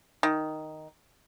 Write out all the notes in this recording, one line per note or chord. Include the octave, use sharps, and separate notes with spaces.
D#3